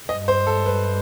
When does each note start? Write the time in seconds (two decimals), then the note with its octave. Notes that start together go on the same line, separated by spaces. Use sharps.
0.09 G2 D#5
0.28 C5
0.47 A4
0.66 B4